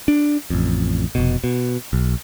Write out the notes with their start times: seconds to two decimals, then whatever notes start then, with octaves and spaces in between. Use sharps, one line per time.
0.08 D4
0.50 A1 F2
1.15 F1 B2
1.44 B2
1.93 B1